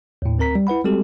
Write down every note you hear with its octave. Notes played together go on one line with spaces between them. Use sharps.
D#2 A2
D2 C4 A#4 A#5 B6
G3
E4 B4 F#5 B5
G3 G#3 C4 F#4 G4 A4